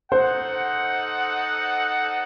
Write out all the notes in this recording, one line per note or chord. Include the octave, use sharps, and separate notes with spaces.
D#4 A4 C5 D#5 F#5